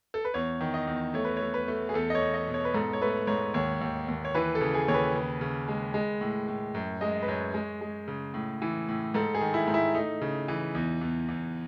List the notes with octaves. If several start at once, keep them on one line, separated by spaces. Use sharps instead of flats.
A4
B4
E2 C#5
D#3
D#5
E2
A3 C#5
B4
C#5
A3
B4
A3
G#4
E2 A4
D#5
C#5
E2
D#5
B2
C#5
B4
G#2 A4
C#5
A3 B4
G#2 C#5
D#2 C#5
D#2
D#2
C#5
E3 B4
A4
C#3
G#4
D#2 C#5
B4
C#3
C#3
G#3
G#3
A2
A2
F#2
G#3 D#5
B4
F#2 C#5
G#3
G#3
C#3
A2
E3
A2
G#2 A4
G#4
D#3
E4
G#2
E4
A3 D#4
C#3
E3
E2
E2
E2